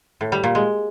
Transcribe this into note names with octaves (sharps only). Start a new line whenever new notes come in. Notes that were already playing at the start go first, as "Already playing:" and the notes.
A2
G3
A#2
G#3